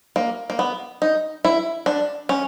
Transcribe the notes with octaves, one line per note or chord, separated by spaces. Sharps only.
A#3
A#3
B3
D#4
E4
D4
C#4